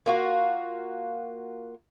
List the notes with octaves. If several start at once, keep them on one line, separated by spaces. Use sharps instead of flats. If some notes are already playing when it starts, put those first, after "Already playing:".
A#3 F4 F#4